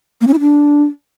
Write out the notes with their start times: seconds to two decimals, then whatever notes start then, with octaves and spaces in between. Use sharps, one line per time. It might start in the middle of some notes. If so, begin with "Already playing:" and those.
0.21 A#3
0.27 C#4
0.34 E4
0.40 D4